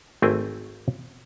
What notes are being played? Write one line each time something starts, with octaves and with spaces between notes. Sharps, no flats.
G#1 A3 C4 G#4 G5 G#5